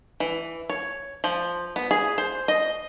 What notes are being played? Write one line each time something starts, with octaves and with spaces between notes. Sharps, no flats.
E3
C#5
F3
B3
G#4
C5
D#5